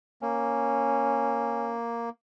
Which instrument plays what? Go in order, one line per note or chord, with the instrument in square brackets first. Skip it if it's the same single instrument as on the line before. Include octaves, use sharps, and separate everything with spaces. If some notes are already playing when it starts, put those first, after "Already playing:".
[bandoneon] A#3 [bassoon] C#4